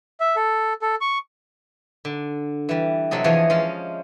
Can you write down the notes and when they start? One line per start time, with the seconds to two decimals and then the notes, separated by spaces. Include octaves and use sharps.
0.20 E5
0.36 A4
0.82 A4
1.01 C#6
2.05 D3
2.69 E3 G3
3.11 C3 F#3 A4 D#5
3.24 E2 E3 F3 G#4 C#5 D#5
3.50 F3 G#3 C#4